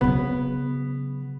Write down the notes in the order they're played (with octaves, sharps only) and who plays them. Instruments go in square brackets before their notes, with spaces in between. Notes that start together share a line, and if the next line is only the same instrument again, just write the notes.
[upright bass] C#3 F#3 [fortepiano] B3